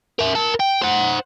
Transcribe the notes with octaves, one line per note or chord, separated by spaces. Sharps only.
A#4 E5
A#4 A5
G5
C5 F#5